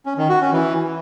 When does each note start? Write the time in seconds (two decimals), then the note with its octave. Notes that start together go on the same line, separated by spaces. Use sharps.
0.06 C#4
0.18 D#3
0.29 F#4
0.41 C#4
0.53 E3